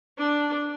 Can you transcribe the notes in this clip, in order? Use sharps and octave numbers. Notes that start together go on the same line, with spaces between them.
D4